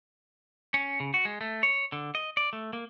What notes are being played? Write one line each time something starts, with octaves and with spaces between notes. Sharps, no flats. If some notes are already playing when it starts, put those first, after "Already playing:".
C#4
C#3
F#4
G#3
A3
C#5
D3
D#5
D5
A3
A#3